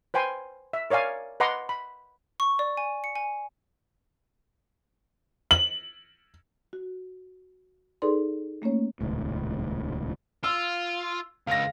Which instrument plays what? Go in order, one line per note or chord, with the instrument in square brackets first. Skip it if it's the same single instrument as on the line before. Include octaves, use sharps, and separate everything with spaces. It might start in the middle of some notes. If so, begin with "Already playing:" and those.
[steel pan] B4 C5 G5 G#5 C6
E5
A#4 C#5 D5 F5 G#5
B4 D#5 F#5 A#5 C6 D6
B5
[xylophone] C#6
D5
G#5
C#7
G#5
[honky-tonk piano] F#7
[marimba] F#4
D#4 G#4 A4 B4 D5 C6
A3 A#3 C#4 C#5
[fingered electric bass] D#1 C#2 A2
[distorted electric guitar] F4 [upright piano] E6
[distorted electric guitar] C#2 [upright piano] F5 A#6